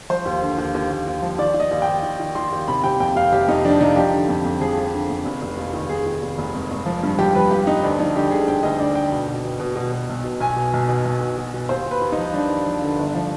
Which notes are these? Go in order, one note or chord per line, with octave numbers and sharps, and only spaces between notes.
F3 C5
D#2
D3
D#2
D#2
D#2
D#2
F3
D#3 D5
D#3
D#5
D#2
G5
D#2
D#3
D#3
D#3 C6
D#2
C3 B5
C3 G5
F2 G5
F1 F5
C3 G4
F2 D#4
F3 D4
C3 D#4
F3 G4
D3
F2
F2
F3 G#4
F3
D3
F2
F1
F1
D#2
D#3
F1 G#4
D#3
F1
F1
G#1
G#1
F3
G2
F3 G4
F3 B4
F3 G4
G2 D#4
D2 D4
F3 D#4
D3 G4
D3 G#4
D2 G5
D2 D#5
D2 D5
D3 G5
B2
B2
B2
B2
B2
B2
B1
B2
B1 G#5
B2
B1
B2
B1
B2
B2
B2
D#2 C5
D#2
B4
D#2
D#4
F3
F3 D4
D#2
F3
D3
G1
F3